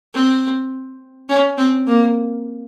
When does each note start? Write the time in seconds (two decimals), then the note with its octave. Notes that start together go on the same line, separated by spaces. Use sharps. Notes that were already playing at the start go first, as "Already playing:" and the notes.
0.13 C4
1.29 C#4
1.58 C4
1.87 A#3